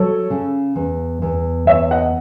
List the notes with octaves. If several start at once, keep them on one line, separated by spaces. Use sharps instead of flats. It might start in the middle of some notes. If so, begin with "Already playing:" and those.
Already playing: F#3 A4 C#5
C#3
E2
E2
E2 C#5 E5
D#5 F#5